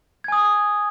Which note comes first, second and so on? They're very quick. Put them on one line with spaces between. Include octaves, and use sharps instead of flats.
G#6 G#5 D#6